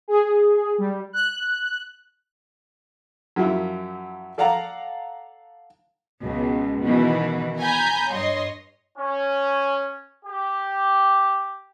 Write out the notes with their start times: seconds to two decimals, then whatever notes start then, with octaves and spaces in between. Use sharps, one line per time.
0.08 G#4
0.78 G3
1.13 F#6
3.36 F#2 F3 F#3 E4
4.38 A4 D5 F5 F#5 A#5
6.22 C#2 B2
6.83 B2 D#3 E3
7.60 G#5 A#5 B5 G6
8.13 G2 C#5 D#5 C6
8.98 C#4
10.25 G4